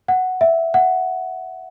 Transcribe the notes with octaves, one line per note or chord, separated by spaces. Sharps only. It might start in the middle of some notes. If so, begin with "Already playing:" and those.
F#5
E5
F#5